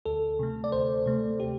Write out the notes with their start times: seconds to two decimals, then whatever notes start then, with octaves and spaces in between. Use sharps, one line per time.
0.05 D2 A4
0.39 C3 A3
0.64 D5
0.72 D2 C5
1.06 C3 A3
1.40 G4